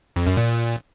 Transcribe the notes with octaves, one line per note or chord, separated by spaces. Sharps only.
F2
F#2
A#2